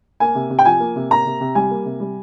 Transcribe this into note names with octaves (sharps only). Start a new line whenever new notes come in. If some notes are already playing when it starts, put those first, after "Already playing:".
A#3 G#5
C3
C3
G5
F3 G#5
A#3
C3
A#3 A#5
C3
C3
G3 G#5
A#3
C3
G3